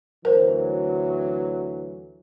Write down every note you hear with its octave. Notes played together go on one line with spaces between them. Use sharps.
D2 E3 F#3 A#4 C5